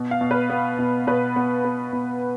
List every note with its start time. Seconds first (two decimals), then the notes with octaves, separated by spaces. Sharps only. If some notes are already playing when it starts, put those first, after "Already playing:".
Already playing: B2
0.11 F5
0.21 B2
0.31 B4
0.50 B3
0.79 B2
1.07 B2 B4
1.36 B3
1.65 B3
1.93 B2